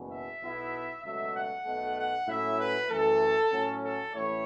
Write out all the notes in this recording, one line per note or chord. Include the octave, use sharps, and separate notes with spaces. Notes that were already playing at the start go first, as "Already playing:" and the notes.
Already playing: F#1 E2 B2
E5
B1 B2 B3 E4
C#2 B2 F#3 A3 E5
F#5
B1 B2 A3
F#5
A2 F#3 C#4 E4 E5
B4
F#2 E3 A3 A4
A2 F#3 C#4
A4
A1 A2 A3 E4 C#5